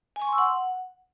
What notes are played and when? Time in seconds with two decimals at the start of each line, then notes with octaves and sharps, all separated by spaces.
0.16 G#5
0.22 C#6
0.27 C6
0.33 E6
0.38 F#5